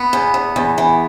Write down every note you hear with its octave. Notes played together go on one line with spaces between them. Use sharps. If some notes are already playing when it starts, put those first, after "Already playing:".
Already playing: B3
E2
E2
E2
E3